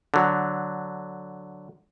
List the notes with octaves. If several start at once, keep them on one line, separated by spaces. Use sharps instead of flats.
D3 F#3